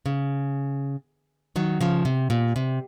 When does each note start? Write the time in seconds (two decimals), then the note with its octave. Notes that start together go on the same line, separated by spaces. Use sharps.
0.06 C#3
1.56 D#3 F#3
1.81 C#3 F3
2.05 C3
2.30 A#2
2.56 C3